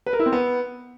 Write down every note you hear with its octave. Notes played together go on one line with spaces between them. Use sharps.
B4
A#4
E4
C4
B3